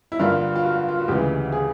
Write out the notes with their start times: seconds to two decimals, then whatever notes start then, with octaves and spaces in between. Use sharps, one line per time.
0.12 E4
0.19 G2 D3 G3 A#3 F4
0.56 F4
0.64 F#4
0.88 F4
0.99 F#4
1.08 D2 C#3 E3 G#3 G4
1.52 G#4